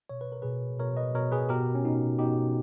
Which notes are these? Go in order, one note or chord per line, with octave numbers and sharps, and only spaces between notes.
B2 C#5
B4
A#4
B2 G#4 B4
B2 A#4 C#5
B4 D#5
B2 A#4 C#5
G#4 B4
B2 G4 A#4
C#4
B2 D#4
B2 D#4 G4